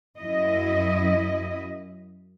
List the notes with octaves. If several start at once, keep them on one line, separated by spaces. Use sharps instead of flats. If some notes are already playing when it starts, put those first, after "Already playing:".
F#2 E4 D#5